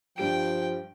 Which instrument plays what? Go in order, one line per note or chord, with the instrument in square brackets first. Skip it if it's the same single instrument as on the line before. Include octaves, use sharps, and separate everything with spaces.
[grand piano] G2 G3 D7 [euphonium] F3 [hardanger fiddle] G5